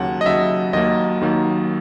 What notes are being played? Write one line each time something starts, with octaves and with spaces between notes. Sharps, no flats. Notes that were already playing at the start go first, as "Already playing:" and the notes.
Already playing: D#2 C#3 F#3 F#5
D#5
D#2 C#3 F#3 E5
D#2 D#3 F#3 A#3 D#5
D#2 D#3 F#3 A#3